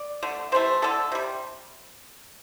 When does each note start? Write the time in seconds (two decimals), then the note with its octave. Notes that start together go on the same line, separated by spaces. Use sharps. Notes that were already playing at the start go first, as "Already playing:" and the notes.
Already playing: D5
0.23 D3 A3
0.52 C3 E3 A3 C5
0.82 D3 A3 A4
1.12 C3 G3